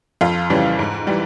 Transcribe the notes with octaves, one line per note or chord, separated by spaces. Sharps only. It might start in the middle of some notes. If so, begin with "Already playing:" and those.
F2 F4
C#3 E3 G3
G#2
E3 G3